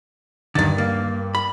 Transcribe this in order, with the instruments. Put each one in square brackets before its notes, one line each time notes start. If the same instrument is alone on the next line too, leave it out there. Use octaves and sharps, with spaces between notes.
[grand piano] G2 A6 [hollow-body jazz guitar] D3 D#3
[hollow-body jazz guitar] A#3
B5